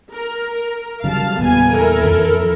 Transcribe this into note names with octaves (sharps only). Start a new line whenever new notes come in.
A#4
C#3 F#3 G3 F5 A5
E2 A#2 G3 B3 G#5
E4 A4 A#4
F2 E3 F3